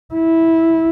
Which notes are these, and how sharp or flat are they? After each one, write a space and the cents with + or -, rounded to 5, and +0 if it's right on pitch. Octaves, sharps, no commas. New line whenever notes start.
E4 -10